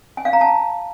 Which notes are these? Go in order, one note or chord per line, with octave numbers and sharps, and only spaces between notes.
G#5
F5
A#5
A5